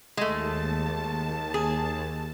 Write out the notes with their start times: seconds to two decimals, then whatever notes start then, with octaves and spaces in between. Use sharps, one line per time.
0.17 D#2 G#3 A3 A5
1.54 G#4